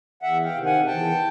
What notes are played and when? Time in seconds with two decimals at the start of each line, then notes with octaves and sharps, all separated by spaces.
0.22 E2 E5 F#5
0.44 F5 G5
0.54 C3 D#3
0.65 F#5 G#5
0.86 E2 G5 A5